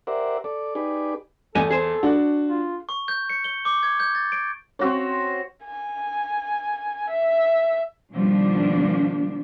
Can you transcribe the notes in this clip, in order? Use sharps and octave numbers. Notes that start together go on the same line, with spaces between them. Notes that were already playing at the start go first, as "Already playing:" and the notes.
G4 A#4 C5 D5 E5 F#5
A4 D5
D#4 G4 G#4 B4 D5
E2 G4 A4 D#5 G#5
G#4 C5
D4 F#4
F4
C#6
G6
C#7
G7
D6
G#6
G6
A6
D7
C4 F#4 C#5
G#5
E5
B2 D#3 F3 G3 A#3 D4